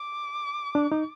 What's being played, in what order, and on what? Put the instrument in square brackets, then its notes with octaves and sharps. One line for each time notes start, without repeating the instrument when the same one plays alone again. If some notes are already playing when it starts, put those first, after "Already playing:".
Already playing: [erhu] D6
[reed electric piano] D4
D#4